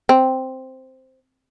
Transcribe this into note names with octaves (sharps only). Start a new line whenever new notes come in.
C4